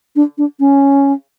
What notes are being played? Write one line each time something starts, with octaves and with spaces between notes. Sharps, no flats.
D4
D4
C#4